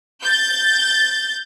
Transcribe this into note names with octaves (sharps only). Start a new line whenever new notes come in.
G6 A6